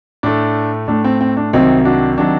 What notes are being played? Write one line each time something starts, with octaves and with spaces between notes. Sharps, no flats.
A2 A3 D4
A2 A3 D4
C4
C4
D4
C2 C3 D#3 F#3 C4 D#4
D4 F#4
C3 D#3 F#3 D4 F#4